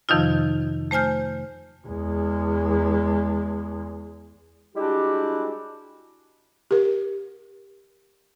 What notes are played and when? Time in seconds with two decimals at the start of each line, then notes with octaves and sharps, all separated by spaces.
0.09 F2 C3 D#3 F3 D#4 F4
0.91 A3 C5 G#5 F6 G6
1.87 E2 G#3
4.76 G3 G#3 D4 E4 F#4 G4
6.71 G4 A#4